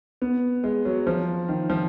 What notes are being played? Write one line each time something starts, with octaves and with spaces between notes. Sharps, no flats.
B3
G#3
F#3
F3
D#3
F3